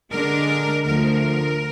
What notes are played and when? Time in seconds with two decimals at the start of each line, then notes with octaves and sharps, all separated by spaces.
0.11 D3 G#3 D4 A#4
0.84 D2 D3 F3 A#4